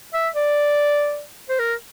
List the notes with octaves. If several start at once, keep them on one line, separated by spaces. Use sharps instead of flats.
E5
D5
C5
A#4